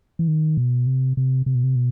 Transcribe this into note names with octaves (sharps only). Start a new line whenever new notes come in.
E3
D#3
B2
C3
C3
C3
B2
C3
B2